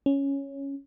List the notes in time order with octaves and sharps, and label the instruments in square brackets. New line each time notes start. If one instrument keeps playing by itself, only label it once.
[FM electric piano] C#4